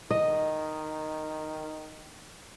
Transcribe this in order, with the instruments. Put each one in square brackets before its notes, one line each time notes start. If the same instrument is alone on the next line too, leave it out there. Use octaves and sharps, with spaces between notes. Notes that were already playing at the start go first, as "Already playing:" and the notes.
[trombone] D#3 [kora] D#5